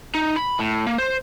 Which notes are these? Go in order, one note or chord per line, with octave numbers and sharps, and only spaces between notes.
D#4
B5
A2
A#3
C5